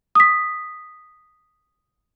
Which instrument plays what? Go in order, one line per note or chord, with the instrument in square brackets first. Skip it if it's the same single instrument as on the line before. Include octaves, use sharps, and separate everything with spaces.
[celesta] D#6 B6